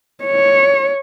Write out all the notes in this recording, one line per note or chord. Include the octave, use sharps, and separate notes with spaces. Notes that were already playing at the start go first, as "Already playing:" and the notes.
C#5